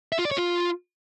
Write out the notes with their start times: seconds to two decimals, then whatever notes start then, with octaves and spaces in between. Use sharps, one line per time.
0.12 E5
0.19 F4
0.25 D5
0.31 C#5
0.38 F4